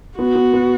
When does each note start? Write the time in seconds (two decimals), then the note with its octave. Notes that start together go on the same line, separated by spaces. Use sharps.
0.18 B3 F#4
0.35 B3
0.53 B3